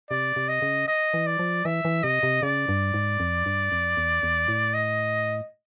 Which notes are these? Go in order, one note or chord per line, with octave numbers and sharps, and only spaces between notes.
C3 D5
C3
D#5
C#3
D#5
E3
D5
F3
E3 E5
E3
C3 D#5
C3
C#3 D5
G2
G#2
F2
G2
F2
E2
E2
A2
D#5